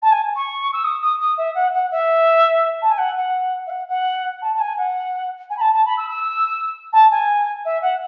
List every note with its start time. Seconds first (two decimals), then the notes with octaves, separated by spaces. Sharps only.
0.02 A5
0.11 G#5
0.35 C#6
0.72 E6
0.84 D#6
1.01 D#6
1.19 D#6
1.37 E5
1.54 F#5
1.73 F#5
1.90 E5
2.81 A5
2.90 G#5
2.97 F#5
3.16 F#5
3.66 E5
3.69 F#5
3.88 F#5
4.41 A5
4.54 A5
4.60 G#5
4.77 F#5
5.49 G#5
5.56 B5
5.60 A5
5.73 A5
5.85 B5
5.97 E6
6.08 E6
6.92 A5
7.10 G#5
7.64 E5
7.81 F#5